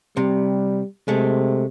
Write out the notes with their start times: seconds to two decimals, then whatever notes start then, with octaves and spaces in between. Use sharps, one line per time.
0.17 C3 G3
1.08 C3 G#3 A3